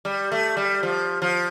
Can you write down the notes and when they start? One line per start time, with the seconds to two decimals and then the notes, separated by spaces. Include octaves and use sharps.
0.05 G3
0.32 A3
0.57 G3
0.83 F3
1.22 F3